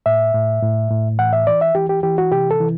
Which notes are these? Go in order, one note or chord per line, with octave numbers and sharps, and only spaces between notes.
A2 E5
A2
A2
A2
E3 F#5
E5
E3 D5
E5
E3 G4
G4
E3 G4
F#4
C3 G4
A4
E3